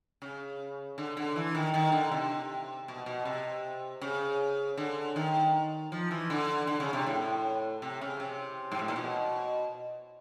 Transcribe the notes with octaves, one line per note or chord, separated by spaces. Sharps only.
C#3
D3
D3
E3
D#3
D#3
D3
C3
B2
B2
C3
C#3
D3
D#3
F3
E3
D3
D3
C#3
C3
A2
C3
C#3
C3
G#2
A2
A#2
B2